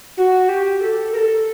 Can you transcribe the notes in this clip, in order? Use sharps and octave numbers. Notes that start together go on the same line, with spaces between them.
F#4
G4
A4
A#4
A4